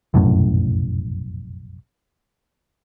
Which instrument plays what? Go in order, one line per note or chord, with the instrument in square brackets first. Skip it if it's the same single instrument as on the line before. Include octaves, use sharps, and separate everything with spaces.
[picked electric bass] F1 B1 F#2 A2